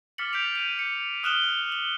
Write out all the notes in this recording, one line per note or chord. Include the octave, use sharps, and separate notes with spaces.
D6 F6 A6 B6 C#7 F#7
G6 B6 D7 F7
G6 D#7 F7
C#7
D#6 F6 F#6 E7 F#7 G7
F#7